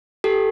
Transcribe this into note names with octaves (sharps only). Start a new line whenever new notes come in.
G4 A4